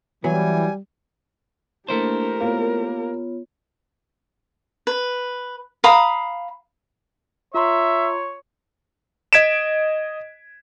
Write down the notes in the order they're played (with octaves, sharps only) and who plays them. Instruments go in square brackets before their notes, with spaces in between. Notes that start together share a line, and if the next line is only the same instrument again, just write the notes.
[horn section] E3 [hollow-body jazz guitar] F#3 B3 [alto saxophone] G3 [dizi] G#5
[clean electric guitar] A3 E4 C5 [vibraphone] A#3 D4 [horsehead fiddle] G4 A#4
[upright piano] A#3 [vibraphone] B3 F4 C#5
[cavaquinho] B4
F5 A#5 B5 D#6
[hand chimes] F4 A#5 C6 [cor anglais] C#5 [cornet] E5
[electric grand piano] D#5 G#6 B6 D7 E7